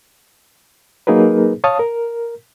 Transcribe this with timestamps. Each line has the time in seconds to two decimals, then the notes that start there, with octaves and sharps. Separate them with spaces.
1.07 F#3 A#3 D#4 G#4 A#4 B4
1.64 C#5 F5 A5 D#6
1.79 A#4